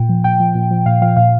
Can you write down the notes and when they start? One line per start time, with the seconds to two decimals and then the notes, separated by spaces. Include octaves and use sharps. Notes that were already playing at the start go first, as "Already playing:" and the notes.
Already playing: A#2 G5
0.09 F3
0.24 A#2 G5
0.40 F3
0.55 A#2
0.71 F3
0.86 A#2 F5
1.02 F3 F5
1.16 A#2 F5